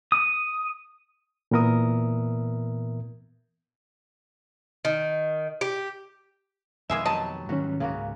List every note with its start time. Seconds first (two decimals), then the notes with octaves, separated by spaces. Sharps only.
0.12 D#6
1.51 A#2 E3 B3 A#4 E5 D#6
4.85 D#3
5.61 G4
6.90 F2 B2 D#3 G#3 A#3 G#4 B4 E5
7.05 F#3 G4 D#5 A5
7.49 G#2 D#3 F#3 G3 C#4 F#4
7.80 C#2 G#2 C#3 A#3 F#4